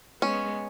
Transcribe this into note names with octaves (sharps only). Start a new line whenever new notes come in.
G#3 B3 C#4